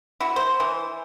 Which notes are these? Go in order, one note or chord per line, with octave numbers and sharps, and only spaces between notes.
E4 F#4
C5
E3